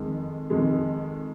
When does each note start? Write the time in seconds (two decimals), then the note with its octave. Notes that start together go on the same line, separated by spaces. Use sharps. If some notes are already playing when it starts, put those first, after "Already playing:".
Already playing: F2 D#3 G#3
0.50 F2 D#3 G#3